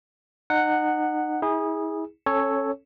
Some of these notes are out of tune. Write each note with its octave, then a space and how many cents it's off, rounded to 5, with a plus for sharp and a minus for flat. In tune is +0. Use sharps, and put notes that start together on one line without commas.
D#4 -30 F#5 +0
E4 -40 G#4 -15
C#4 -25 A4 +0 C#5 +0